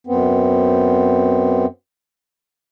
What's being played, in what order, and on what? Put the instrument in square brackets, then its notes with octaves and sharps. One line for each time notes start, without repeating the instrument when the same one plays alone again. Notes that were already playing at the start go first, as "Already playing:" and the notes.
[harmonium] F#2 B3 C4